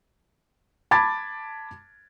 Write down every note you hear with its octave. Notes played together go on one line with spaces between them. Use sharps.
A5 B5 D6 G#6 A6